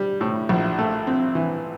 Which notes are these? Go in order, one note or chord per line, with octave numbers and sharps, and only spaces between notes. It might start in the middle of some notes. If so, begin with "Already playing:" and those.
Already playing: G3
A2
A#1
A3
C4
E3